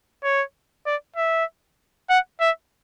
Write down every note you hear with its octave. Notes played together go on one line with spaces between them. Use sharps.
C#5
D5
E5
F#5
E5